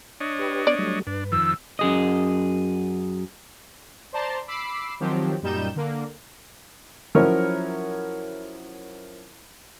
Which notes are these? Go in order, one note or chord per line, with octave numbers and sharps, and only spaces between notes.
D4 C#5 D#5
G4 B4
B3 D5
F#3 G3 A3
G2 D4 B4
F2 D#3 F3 E6
F#2 G#4 D#5
C5 D5 A5 A#5 C6
B5 D6 E6 C7
D#3 F3 F#3 C4 G4
F#2 A#2 G3 D#4 G6 E7
D3 A#3
F3 F#3 C#4 E4 A#4 C#5